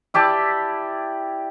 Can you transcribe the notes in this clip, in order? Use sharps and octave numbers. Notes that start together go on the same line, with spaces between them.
E4 G4 D5 A5